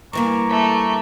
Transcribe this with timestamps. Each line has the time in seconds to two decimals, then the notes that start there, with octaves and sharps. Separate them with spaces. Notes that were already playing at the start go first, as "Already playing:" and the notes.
0.13 G2 E3 A#3 A#5 C#6 D6
0.49 A3